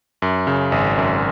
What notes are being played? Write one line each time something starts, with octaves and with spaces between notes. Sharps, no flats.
F#2
C#3
G#1
F#2